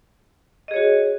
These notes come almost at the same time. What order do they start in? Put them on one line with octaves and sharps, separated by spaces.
D#5 G#4 C#5 F#4